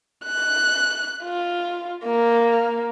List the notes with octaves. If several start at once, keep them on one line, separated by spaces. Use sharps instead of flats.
F#6
F4
A#3